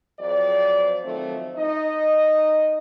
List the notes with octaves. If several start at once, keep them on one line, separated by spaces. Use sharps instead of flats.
F2 F#3 C5 D5
D#3 F3 F#3 A3 C4
D#4 D#5